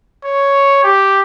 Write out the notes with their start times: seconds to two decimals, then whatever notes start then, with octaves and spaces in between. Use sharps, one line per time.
0.25 C#5
0.84 G4